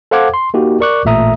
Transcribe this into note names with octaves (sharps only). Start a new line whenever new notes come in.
A4 C5 F5 F#5 D6 G#6
C6
A#3 D#4 F#4 G4
A#4 D5 C#6 D6 F#6
A1 A#2 A3 E5 A#5 D#6